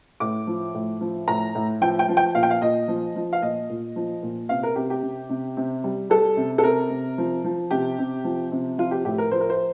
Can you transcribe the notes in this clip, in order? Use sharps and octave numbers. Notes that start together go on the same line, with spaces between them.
A2 D6
F3
A2
F3
A2 A#5
A2
F3 G5
G5
F3
G5
A#2 F5
G5
F5
A#2 D#5
F3
F3
F5
A#2 D#5
A#2
F3
A#2
C3 F5
A#4
C3 G4
G4
C3
C3
C3
G3
G3 A4
C3
A4
C3 A#4
C3
F3
F3
C3 G4
C3
F3
C3
F3 F4
G4
A2 G4
A#4
F3 C5
A#4
C5